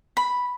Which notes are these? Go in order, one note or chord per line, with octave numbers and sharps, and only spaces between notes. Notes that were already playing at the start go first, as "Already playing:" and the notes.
B5